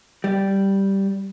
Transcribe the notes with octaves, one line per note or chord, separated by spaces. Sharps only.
G3